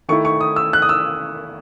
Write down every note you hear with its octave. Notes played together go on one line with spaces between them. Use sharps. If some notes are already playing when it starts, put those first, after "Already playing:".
D#3 A3 E4 C#6
C#6
D#6
E6
F#6
D#6
E6